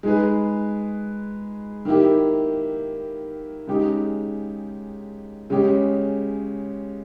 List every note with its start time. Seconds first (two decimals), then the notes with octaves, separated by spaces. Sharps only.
0.03 G#3 D#4 G#4 B4
1.85 D#3 A#3 E4 G4
3.67 C#3 G#3 D#4 G4
5.50 C#3 G#3 C#4 G4